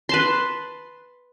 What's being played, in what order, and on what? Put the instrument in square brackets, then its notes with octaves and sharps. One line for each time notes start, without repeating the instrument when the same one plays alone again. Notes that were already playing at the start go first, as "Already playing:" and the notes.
[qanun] B4 A5 C6